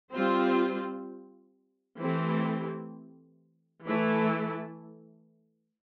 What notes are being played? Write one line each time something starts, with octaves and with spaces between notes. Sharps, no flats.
G3 C4 F4 C5
E3 A3 C4 G4
E3 A3 E4 A4